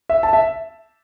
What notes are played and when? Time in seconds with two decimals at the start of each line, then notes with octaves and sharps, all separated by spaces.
0.09 E5
0.23 A5
0.33 E5